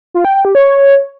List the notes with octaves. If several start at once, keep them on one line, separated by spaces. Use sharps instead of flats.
F4
G5
G5
G4
C#5